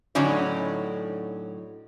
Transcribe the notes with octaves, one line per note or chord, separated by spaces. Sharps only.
A2 D3 F#3 C#4 D#4 D5